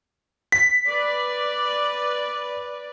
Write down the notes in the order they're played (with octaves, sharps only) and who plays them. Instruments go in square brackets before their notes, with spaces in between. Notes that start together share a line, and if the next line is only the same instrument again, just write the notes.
[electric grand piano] B6
[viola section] B4 D5